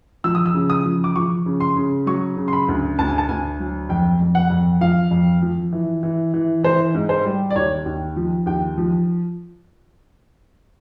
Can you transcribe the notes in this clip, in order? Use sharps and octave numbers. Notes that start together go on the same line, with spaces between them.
F3 E6
D#6
E6
C#3
D#6
F3
D6
F3 C#6
C#3
C6
C#3
F#3 C#6
C#3
C6
B5
D2
D2 A5
G#5
A5
D2 G#5
F#3
F2 G5
F2
F#5
F2
F3 F5
F2
F3
E3
E3
E3
E3 C5
G#2
C5
G3
D5
D#2 C#5
D#2
F3
D#2 G5
F3